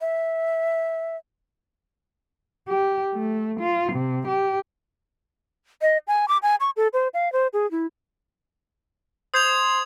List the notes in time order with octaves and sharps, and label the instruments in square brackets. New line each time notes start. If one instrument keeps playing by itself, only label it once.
[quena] E5
[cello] G4
A3
F4
C3
G4
[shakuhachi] D#5
G#5
D6
G#5
C#6
A4
C5
F5
C5
G#4
E4
[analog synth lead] C5 [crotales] D#6 G#6 F7